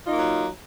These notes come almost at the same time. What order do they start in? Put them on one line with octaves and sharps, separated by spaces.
F4 D#4 A#3 F#3